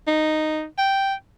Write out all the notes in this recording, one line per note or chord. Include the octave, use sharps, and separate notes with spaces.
D#4
G5